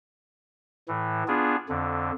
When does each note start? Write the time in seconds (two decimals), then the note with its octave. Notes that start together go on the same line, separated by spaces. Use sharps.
0.88 A2 E3
1.28 B3 D4 F4 G#4
1.69 F2 D3